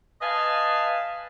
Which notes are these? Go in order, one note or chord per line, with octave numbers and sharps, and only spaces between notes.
B4 D#5 F5 G#5 A5